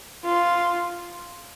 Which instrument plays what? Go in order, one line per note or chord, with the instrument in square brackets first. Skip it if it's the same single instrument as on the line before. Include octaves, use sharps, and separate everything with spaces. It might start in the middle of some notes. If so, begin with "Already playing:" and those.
[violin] F4